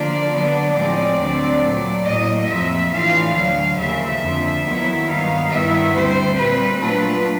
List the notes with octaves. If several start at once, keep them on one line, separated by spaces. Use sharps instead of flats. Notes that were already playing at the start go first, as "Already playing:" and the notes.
Already playing: D3 F3 A#3 D4 F4 D5
D3 F#3 B3 D4
A2 F3 G#3 C4 D5
D2 D3 F#3 A3 C4
A#2 F#3 A3
A2 F#3 A#3 D#5
F2 C3 F3 E5
A2 E3 A3 D4 F4 F5
D2 D3 F#3 F5
D#2 C#3 F3 A#3 E5
F2 D3 F3
D#2 D#3 F#3 B3 E4
G2 D#3 F#3 B3 D#4 F5
G2 D#3 G3 B3 E4 E5
D2 D3 G3 C4 C5
A#2 G3 C4 B4
A#2 F#3 A3 D4 F4 B4